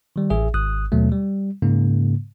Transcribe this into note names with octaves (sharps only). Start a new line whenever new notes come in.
D#3 G3
A1 G#4 E5
G#1 D#6 F#6
D#2 B2 F#3 A3
G3
G#2 C#3 A#3